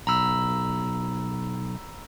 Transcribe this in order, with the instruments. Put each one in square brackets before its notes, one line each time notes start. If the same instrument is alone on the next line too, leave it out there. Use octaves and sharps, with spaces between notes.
[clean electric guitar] B1 [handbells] A#5 B5 E6